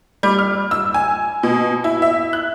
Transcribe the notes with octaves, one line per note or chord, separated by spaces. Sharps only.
G3
F6
E6
G#5
B2
E4
E5
F#6